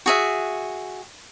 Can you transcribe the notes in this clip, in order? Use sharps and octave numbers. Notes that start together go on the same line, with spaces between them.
F#4 G#4 E5